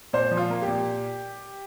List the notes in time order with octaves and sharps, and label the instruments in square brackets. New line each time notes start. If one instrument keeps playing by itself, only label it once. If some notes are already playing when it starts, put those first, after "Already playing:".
[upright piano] A#2 C5
F3
F4
A#3
G4
A#2